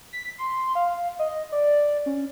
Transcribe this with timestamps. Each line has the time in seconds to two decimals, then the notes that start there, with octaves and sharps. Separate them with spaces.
0.13 B6
0.38 C6
0.75 F5
1.19 D#5
1.52 D5
2.06 C#4